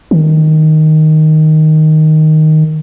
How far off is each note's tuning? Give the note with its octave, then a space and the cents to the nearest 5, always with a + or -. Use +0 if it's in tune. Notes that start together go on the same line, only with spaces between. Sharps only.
D#3 +0